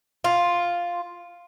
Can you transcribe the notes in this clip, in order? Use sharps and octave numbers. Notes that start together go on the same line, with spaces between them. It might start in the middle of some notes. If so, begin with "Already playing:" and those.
F4